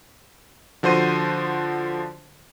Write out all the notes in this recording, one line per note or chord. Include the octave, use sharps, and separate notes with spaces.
D3 F3 F#4 C5 C6 D#7